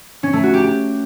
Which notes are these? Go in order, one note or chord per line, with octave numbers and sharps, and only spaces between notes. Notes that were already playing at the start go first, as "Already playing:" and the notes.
C#4
A3
F#4
G4
G4